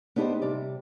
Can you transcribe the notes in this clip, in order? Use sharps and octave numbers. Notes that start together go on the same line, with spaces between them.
B3 D4 D#4 G4 A4 C5
C3 G3 D5